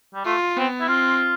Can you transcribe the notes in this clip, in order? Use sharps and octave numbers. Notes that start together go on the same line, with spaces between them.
G3
A3 F4
B3 C4
E4
C4 F4